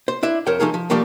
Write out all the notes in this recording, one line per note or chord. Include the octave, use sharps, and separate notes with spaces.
C5
D4 E4 E5
F2 A#4 C5 C#5 G5
F3 A3 D#4 G#4 A#4
F3
F3 G3 A3 A#3